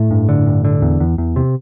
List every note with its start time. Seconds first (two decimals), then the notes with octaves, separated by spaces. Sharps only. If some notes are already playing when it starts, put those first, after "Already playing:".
Already playing: A2 A3
0.11 G2
0.29 D3
0.47 G2
0.65 D3
0.82 E2
1.00 E2
1.18 E2
1.36 C3